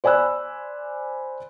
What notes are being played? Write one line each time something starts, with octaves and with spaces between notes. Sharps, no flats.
C5 D5 G#5 B5 E6 F#6